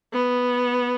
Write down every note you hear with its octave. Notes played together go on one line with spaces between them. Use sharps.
B3